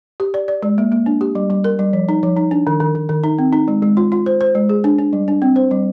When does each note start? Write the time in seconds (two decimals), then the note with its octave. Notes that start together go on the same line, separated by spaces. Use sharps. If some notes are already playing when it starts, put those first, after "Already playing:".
0.20 G4
0.34 D5
0.48 D5
0.63 G#3
0.78 A#3
0.92 A#3
1.06 D4
1.21 G4
1.35 G3
1.50 G3
1.64 A#4
1.79 G3
1.93 F3
2.09 D#4
2.23 F3
2.36 D#4
2.51 D4
2.67 D#3
2.80 D#3
2.95 D#3
3.09 D#3
3.24 D#4
3.38 C4
3.53 D#4
3.68 G#3
3.82 G#3
3.97 F4
4.12 F4
4.26 C5
4.41 C5
4.55 G#3
4.69 G#4
4.84 D4
4.98 D4
5.13 G3
5.28 D4
5.42 C4
5.56 C5
5.71 G3